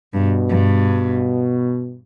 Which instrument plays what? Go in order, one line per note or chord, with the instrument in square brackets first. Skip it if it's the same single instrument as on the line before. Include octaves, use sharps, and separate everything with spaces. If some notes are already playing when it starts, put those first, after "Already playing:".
[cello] G2 [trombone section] B2
[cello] G2